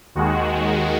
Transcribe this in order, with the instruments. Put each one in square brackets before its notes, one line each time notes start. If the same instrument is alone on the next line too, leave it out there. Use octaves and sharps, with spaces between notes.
[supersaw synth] D#2 D#3 G#3 F#4